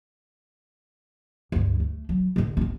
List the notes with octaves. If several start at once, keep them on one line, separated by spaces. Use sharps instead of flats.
D2 G2
A3
F#3
A2 D3
B3 C4